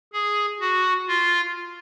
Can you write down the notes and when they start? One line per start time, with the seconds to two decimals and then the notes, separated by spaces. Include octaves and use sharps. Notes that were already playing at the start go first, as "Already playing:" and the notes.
0.13 G#4
0.60 F#4
1.08 F4